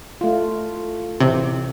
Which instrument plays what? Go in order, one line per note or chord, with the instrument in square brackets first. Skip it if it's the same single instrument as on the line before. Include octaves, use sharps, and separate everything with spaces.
[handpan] A3 F4
[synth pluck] A1 C3